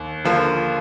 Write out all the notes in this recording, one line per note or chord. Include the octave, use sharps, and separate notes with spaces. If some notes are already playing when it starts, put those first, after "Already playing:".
Already playing: D#2
D3 F3 A#3